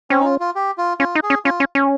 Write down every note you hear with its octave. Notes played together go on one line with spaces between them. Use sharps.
C4 C#4
D#4
F4
F4
G4
F4
C#4 F4
D#4
G#4
C#4
C#4 F4
C#4
C#4